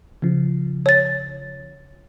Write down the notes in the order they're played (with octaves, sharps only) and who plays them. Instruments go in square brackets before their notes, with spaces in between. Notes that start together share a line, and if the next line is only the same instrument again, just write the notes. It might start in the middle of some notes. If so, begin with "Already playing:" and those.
[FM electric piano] C#3 F3
[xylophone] C#5 A6